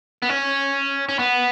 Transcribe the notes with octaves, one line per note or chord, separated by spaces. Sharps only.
B3
C#4
C#4
B3